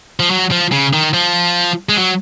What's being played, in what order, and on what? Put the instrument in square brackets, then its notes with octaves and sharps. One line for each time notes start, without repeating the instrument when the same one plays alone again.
[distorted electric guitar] F3
F#3
F3
C#3
D#3
F3
G#3
F#3